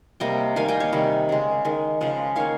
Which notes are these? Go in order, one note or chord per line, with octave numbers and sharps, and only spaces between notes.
C3 G3 A#3 D#5 G5
D#3 G3 A#3 F5 G#5
D#5 G5
C#5 F5
C3 D#3 G3
C#3 G#3
D#3 G#3
C#3 F3 G#3
D#3 A#3 C#5 F5